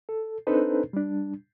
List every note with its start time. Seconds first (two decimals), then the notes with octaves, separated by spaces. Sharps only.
0.09 A4
0.47 C4 D4 D#4 A4 B4 C5
0.93 G3 D4